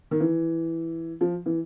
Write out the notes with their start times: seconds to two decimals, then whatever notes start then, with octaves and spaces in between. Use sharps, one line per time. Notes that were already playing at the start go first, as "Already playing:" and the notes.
0.11 D#3
0.20 E3
1.21 F3
1.46 E3